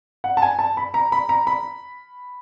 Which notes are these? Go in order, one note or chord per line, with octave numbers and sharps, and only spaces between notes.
F#5
A5
G#5
A5
B5
A#5
B5
A#5
B5